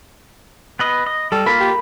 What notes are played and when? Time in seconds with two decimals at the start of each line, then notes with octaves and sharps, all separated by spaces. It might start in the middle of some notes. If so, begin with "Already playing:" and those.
0.79 B3 B4 D#5
1.06 D#5
1.32 G3 A4
1.46 A#3 F4 A#4 B5
1.60 G4